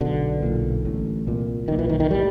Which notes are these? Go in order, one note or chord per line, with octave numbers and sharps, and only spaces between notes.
B1 B2 D3
B1 A#2
A1 A2
C2 A#2
B1 A#2 D#3
E3
D#3
D#3
A2 G3